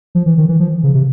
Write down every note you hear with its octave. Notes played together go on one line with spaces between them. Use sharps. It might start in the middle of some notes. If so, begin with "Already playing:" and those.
F3
E3
D#3
E3
F3
C#3
C3